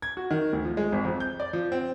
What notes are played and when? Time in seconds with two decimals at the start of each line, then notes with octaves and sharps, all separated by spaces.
0.02 G#6
0.17 F#4
0.31 D#3
0.53 D2
0.65 F3
0.77 G#3
0.92 G#1
1.05 F2
1.20 G6
1.40 D5
1.53 F3
1.72 C4